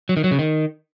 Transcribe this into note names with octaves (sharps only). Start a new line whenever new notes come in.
F#3
D#3
F#3
C#3
D#3